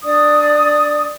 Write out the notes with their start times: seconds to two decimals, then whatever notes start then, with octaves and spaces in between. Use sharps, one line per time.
0.03 D4 D5 D#6